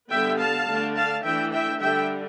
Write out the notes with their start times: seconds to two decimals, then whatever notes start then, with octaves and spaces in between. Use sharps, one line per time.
0.11 D3 G3 B3 E5 G5
0.39 F5 A5
0.68 D3 A3 D4
0.96 F5 A5
1.24 E3 A3 D4 E5 G5
1.52 E5 G5
1.80 D3 G3 D4 E5 G5